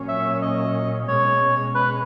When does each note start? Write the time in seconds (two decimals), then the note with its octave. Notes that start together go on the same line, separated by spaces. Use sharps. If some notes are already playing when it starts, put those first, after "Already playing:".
Already playing: A#2 F#3 A#3 C#4
0.08 E5
0.42 D#5
1.08 B2 G#3 C#4 C#5
1.75 B4